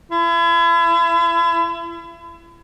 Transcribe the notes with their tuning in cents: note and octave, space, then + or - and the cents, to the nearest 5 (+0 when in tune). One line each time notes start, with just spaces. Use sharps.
E4 +40